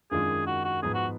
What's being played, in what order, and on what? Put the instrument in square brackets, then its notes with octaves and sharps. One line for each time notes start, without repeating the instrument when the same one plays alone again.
[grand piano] F#2 D#3 G#3 D4 F4 [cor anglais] G#4
[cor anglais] F#4
F#4
[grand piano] G#2 F3 B3 [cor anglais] G#4
[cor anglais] F#4